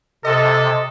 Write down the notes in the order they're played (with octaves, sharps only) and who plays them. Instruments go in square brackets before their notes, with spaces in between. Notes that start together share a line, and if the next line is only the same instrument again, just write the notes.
[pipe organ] C3 [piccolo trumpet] A4 [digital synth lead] D#5